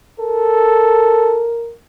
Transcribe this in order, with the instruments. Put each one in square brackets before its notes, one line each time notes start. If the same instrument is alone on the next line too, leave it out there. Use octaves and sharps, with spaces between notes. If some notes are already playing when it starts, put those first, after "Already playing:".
[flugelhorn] A4 [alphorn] A#4